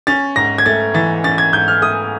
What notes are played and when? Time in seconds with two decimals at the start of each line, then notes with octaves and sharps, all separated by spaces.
0.07 C#4 A6
0.36 G#2 A#6
0.58 G#6
0.66 A3 A6
0.94 E3 A6
1.24 C#4 A6
1.38 G#6
1.53 G#2 G6
1.68 F6
1.82 A3 D#6